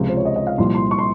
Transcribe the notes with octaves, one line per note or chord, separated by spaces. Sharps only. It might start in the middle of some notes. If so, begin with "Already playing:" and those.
Already playing: C#2 C3 F3
C5
C#5
D#5
D#5
F5
C2 A#2 F3 C6
C6
C#6
C6